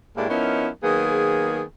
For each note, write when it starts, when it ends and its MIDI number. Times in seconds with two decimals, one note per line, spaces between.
0.17 0.27 45
0.17 0.27 56
0.17 0.27 58
0.17 0.27 62
0.17 0.27 64
0.17 0.27 67
0.29 0.68 53
0.29 0.68 59
0.29 0.68 61
0.29 0.68 63
0.29 0.68 64
0.29 0.68 70
0.83 1.62 51
0.83 1.62 54
0.83 1.62 58
0.83 1.62 59
0.83 1.62 68